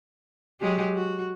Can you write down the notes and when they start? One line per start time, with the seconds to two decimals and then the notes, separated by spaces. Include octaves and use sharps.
0.61 F#3 G#3 G4
0.95 F#4